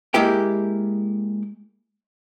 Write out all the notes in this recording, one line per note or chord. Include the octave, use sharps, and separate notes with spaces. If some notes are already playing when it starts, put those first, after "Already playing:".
G#3 A#3 E4 G4 G5